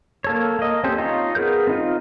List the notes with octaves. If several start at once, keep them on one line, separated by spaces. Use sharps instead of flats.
A#3 A4 C#5
A#3 D#5
C4 C#4 G4 A4 C5
D#4 F4 C#5 D#5
B3 G#4 A#4 G6
C4 D#4 F4